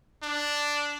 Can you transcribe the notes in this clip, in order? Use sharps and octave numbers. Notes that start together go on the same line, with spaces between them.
D4